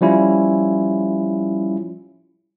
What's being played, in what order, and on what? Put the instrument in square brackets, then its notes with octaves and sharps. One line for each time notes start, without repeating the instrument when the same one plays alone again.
[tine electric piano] F3 G3 C#4 E4 F4